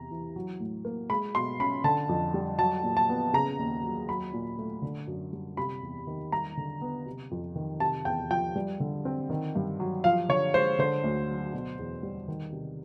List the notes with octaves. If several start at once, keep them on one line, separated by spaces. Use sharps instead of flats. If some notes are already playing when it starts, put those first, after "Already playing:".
Already playing: E2 C3 A#5
E3
F#3
A2
A#3
G#3 B5
B2 C6
C#4 B5
D3 A5
F2
G3
F#3 A5
A#2
A5
B3
C#3 A#5
D#2
F#3
F#3 B5
A#2
A3
D3
F#2
G3
C3 B5
E2
D#3
G3 A#5
D3
B3
C3
F2
D#3
C3 A5
E2 G5
F3 G5
G3
D3
C4
D#3
G2
F#3
F3 F5
D3 C#5
G#3 C5
D3 C5
D2
F#3
B2
E2
G3
D#3
C3